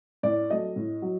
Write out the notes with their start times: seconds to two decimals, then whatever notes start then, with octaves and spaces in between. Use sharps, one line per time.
0.23 A2 D5
0.50 F#3 A3 D#5
0.76 A2
1.02 F#3